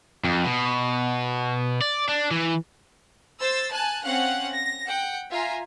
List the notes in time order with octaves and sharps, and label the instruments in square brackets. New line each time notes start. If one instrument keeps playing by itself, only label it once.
[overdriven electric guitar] F2
B2
D5
D4
E3
[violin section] C5 E6 A6
G#5 A5 F#6
C4 C#4 F5 F#5 F#6
A#6
F#5 G5
F4 E5 G#5 A#5